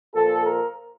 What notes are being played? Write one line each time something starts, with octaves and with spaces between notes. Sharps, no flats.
A#2 F3 A#3 A4
A#4